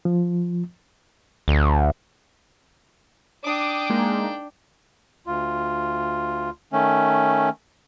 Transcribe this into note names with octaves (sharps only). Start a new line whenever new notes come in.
F3
D2
D4 G5 D6 D#6
G#3 A#3 D#4
D2 F4
D#3 A3 C#4